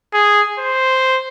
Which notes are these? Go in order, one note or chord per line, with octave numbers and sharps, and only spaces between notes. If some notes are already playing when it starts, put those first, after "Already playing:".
G#4
C5